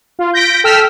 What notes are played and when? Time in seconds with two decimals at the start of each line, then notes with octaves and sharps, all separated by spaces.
0.19 F4
0.33 G6 A#6 B6 D7
0.64 A4 G5 E6 F6 B6